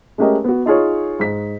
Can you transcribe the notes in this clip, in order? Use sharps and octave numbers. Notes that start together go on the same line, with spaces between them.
G#3 A3 C#4 G4 A#4 D#5
B3 F#4
D#4 F4 G#4 C#5
G#2 B6